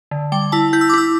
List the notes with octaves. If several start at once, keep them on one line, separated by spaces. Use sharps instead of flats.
D3
G3 G5
E4 A5
E4 G6
E6
D6
E4 E6